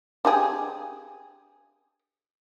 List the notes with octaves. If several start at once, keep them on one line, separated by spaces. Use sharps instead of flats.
D4 G4 G#4